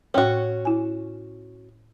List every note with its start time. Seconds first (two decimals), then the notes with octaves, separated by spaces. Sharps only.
0.14 A2 C#4 F#4 C#5 G5
0.65 E4 G#5